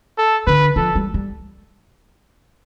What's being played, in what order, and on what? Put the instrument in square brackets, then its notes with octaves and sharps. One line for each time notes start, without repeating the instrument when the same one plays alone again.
[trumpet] A4
[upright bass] D3 [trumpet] B4
[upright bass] F3 [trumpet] A4
[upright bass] G3
G3